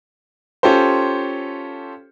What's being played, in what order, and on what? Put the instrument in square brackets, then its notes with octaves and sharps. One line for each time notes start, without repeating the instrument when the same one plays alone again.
[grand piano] C#4 F4 G4 A4 C5